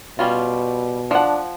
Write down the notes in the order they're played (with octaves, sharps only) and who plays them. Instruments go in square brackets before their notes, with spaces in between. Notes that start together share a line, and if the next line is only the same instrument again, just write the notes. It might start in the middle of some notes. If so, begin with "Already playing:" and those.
[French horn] B2 [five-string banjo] G3 C#4 F4
[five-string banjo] F3 F#5 [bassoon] D4